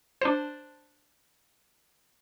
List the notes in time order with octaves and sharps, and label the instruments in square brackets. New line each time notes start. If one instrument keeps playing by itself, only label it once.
[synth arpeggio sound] D4 C5